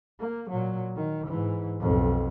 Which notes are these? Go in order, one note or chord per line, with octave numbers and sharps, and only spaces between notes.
A#3
A#2 F#3
D#3
G#2 E3
B1 F2